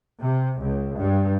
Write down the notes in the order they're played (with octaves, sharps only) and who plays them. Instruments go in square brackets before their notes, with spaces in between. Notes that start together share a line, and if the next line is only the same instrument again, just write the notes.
[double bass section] C3
C#2
G2